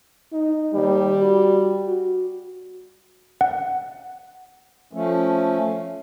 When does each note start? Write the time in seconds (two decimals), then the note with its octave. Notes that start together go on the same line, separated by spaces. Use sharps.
0.32 D#4
0.75 D#2 G3
1.22 F#4
1.86 F#4
3.41 F#5
4.93 F3 A3 C#4